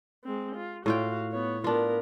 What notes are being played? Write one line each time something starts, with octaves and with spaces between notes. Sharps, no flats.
G#3 C4
F4
A2 F4 F#4 F5 G5
B3 C#5
B3 D4 F4 A#4